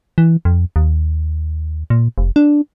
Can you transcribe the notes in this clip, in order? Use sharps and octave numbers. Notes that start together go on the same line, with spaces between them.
E3
F2
D#2
A#2
F1
D4